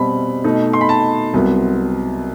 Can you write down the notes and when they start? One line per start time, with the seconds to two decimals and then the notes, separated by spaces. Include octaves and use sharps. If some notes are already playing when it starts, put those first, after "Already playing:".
Already playing: B2 G3 C4 B5
0.44 B2 A3 D#4
0.73 C6
0.81 B5
0.89 A5
1.33 C2 C3 F#3 B3